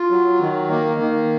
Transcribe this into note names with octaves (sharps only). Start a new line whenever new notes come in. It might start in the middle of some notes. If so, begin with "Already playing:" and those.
Already playing: F4
F#3
D#3
A#3
D#3